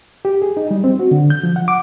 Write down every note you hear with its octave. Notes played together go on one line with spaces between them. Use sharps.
G4
G#4
D#4
G3
C4
F#4
D3
G6
F3
F#5
D6